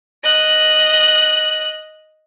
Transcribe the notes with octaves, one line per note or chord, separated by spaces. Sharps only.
D#5 F#6